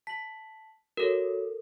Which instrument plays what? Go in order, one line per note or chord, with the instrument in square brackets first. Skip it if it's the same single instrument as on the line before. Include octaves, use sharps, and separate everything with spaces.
[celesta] A5 F#7 [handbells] B6
[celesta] F#4 C#5 [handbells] A4 A#4